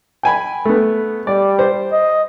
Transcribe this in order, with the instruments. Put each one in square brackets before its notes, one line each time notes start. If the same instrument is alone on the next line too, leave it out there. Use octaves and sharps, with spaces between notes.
[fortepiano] G5 G#5 B5
A3 B3
[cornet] G3 [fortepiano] D5
[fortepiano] C5
[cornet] D#5